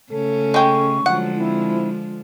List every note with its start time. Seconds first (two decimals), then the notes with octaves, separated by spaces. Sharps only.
0.12 C#3 A3 C#4 A4
0.54 G#3 G5 C#6
1.06 D3 F3 F#3 G#3 F#5
1.36 C4 E4